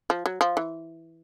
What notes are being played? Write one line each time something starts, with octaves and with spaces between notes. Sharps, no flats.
F3
F#3
F3
E3